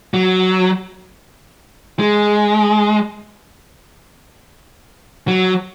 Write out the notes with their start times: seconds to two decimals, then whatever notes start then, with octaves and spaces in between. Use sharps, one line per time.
0.14 F#3
1.99 G#3
5.28 F#3